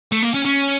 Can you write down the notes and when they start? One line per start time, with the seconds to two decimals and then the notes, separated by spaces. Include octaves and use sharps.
0.12 A3
0.23 A#3
0.34 C#4
0.45 C#4